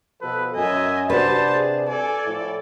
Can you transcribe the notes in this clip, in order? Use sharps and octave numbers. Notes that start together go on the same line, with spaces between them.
B2 F3 A4 B4
F#2 D#5 E5 G#5
C3 D4 F#4 B4 C5 A5
G#4
A4 D5 G#5
A2 F3 E4